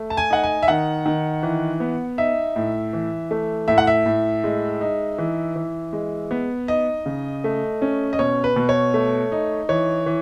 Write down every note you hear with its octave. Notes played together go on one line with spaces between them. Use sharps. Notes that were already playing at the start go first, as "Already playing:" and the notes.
Already playing: A3
A5
G#5
D#4 F#5
G#5
E5
D#3 F#5
D#3
E3
B3
D#4 E5
A2
E3
A3
A2 E5
F#5
E5
A2
G#3
D#4
E3
E3
G#3
B3
D#4 D#5
C#3
A3
C#4
D#5
B2 C#5
B4
B2
C#5
A3
D#4
E3 C#5
E3